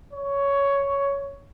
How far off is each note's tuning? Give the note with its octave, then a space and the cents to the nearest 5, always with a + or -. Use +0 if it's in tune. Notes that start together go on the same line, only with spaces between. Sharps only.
C#5 +10